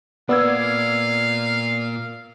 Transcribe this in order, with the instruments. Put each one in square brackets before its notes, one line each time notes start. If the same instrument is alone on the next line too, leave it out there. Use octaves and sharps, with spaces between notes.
[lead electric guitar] A#2 A#3 [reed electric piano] B3 [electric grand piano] D5 E6 G#6 [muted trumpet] F5